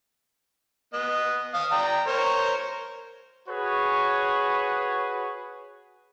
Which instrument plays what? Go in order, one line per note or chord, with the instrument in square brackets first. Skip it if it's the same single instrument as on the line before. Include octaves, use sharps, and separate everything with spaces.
[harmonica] B3 D#5
F5 D#6
D5 G5 A#5
A#4 C5 C#5
[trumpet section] F#4 G#4 B4 C#5